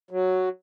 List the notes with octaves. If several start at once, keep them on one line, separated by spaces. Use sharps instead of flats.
F#3